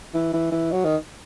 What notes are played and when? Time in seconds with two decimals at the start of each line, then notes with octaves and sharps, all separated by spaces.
0.14 E3
0.33 E3
0.52 E3
0.72 F#3
0.85 D#3